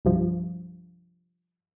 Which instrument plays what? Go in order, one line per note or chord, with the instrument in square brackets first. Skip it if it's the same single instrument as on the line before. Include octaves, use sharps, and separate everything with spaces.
[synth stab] C2 G2 F3